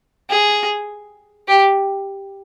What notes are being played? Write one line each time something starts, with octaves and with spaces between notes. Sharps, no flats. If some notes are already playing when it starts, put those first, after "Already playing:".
G#4
G4